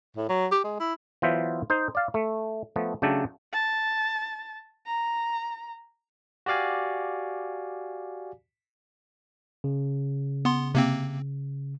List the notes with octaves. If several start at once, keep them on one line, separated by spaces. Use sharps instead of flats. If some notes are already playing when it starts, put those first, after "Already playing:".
A2
F#3
G4
G#3
E4
E3 F#3 B3 F4 C5 E5
D#4 C5
D5 F5
A3
F3 A3 B3
C#3 F#3 A3 D4 G4 A4
A5
A#5
F#4 G4 D5 F5 G#5
C#3
B3 C6
C3 A#3 C4